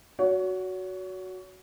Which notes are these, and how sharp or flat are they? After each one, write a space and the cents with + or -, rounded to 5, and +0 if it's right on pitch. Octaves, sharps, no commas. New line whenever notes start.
F#4 +0 C#5 +35